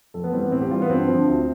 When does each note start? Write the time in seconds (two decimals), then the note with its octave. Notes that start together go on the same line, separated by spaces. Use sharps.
0.14 F2 A4
0.24 B3
0.33 E3 G3 C4
0.42 B3
0.52 A2 C4
0.62 G4
0.71 E3 G3 F4
0.82 B3
0.90 G2 C4
1.09 D3 F3
1.28 D2